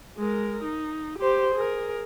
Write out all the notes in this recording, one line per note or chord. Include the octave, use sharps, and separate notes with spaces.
G#3 A#4
D#4
G4 C5
G#4 A#4